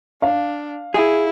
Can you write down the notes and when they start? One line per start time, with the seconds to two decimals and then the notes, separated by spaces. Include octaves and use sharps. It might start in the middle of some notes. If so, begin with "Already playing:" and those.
0.22 D4 F5
0.94 E4 G#4